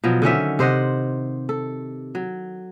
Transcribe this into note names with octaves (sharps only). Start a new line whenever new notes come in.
B2 F3 F#3
D3 D#3 C#4 E5
C3 C5 D#5 F#5
A4
F#3